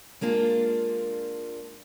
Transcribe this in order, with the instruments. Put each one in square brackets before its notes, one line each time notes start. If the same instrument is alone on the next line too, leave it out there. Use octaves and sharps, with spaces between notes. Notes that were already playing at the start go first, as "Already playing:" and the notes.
[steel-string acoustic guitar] G#3 A#3 D4 F4